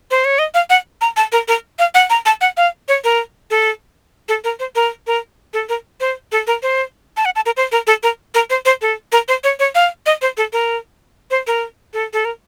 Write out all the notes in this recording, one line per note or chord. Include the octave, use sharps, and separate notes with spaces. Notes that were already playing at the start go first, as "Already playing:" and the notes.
C5
C#5
D#5
F5
F#5
A#5
A5
A#4
A#4
F5
F#5
A#5
A5
F#5
F5
C#5
A#4
A4
A4
A#4
C5
A#4
A#4
A4
A#4
C5
A4
A#4
C5
A5
F#5
A5
A#4
C5
A#4
A4
A#4
A#4
C5
C5
A4
A#4
C5
C#5
C#5
F5
D#5
C5
A4
A#4
C5
A#4
A4
A4
A#4